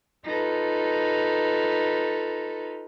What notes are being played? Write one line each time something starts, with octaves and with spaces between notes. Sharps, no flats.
D#4 F4 A4 B4